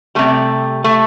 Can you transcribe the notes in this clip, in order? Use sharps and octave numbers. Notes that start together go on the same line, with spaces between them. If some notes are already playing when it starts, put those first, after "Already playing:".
C3 G3 A3
A3